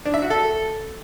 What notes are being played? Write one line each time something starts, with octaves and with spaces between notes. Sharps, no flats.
D4
E5
F#4
A4